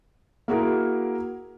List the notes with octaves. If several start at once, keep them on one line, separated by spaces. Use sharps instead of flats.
A#3 E4 F#4 G#4 A#4